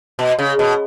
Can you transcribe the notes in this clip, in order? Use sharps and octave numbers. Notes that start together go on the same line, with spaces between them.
B2
C#3
B2